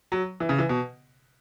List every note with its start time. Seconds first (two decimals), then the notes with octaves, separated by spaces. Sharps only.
0.12 F#3
0.40 E3
0.49 C#3
0.59 E3
0.69 B2